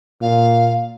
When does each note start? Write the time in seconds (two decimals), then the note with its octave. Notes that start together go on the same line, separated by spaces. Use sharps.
0.21 A#2 F5